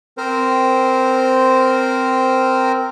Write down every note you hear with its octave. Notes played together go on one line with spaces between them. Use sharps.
C4 A#4 C5